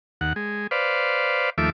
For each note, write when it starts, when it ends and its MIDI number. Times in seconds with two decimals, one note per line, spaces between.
0.21 0.33 39
0.21 0.33 78
0.36 0.67 56
0.71 1.50 71
0.71 1.50 72
0.71 1.50 74
0.71 1.50 77
1.58 1.70 39
1.58 1.70 53
1.58 1.70 57
1.58 1.70 76
1.58 1.70 86